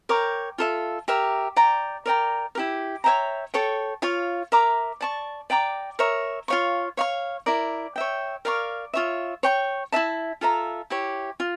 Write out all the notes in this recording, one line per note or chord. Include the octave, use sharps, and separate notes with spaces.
A#4 C#5 G5 D6
F4 A4 E5
G4 A#4 E5 A#5
D5 G5 A#5
A#4 D5 G5 A#5
E4 G4 A#4
C#5 E5 G5 A#5
A4 C#5 G5 C#6
F4 C#5 F5
A#4 E5 A#5 D6
D5 A5 C#6
D5 G5 A#5 D6
A#4 C#5 E5
F4 C#5 F5 C#6
C#5 F5 C#6
E4 A#4 D5
C#5 E5 G5
A#4 D5 F5 C#6
F4 C#5 E5
C#5 G5 C#6
E4 A4 E5 A5
F4 A4 E5 A#5
E4 G4 C#5
F4